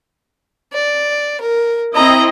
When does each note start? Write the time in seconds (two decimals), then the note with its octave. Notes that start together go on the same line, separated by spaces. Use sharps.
0.73 D5
1.41 A#4
1.95 C4 E4 D#5 A#5